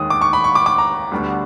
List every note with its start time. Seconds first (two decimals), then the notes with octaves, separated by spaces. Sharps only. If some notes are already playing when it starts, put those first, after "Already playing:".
Already playing: D#2 D#3 G#3 D#6
0.10 D6
0.21 C#6
0.33 B5
0.44 C#6
0.55 D6
0.66 D6
0.78 A#5
1.12 D2 D3 G3 B3